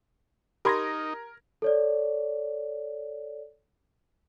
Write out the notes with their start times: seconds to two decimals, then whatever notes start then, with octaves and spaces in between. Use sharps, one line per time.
0.65 D#4 G4 A#4 B5 C6 G#6 A#6
1.62 A4 C#5 D5